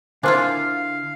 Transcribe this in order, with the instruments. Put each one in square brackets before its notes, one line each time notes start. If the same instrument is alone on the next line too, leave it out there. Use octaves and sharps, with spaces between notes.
[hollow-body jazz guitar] D3 [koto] D4 E4 F4 [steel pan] A#4 C5 G#5 [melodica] F5